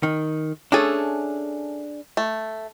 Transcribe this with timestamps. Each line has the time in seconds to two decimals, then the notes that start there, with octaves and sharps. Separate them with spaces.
0.03 D#3
0.72 A3 C#4 D4 G#4 A4
2.17 A3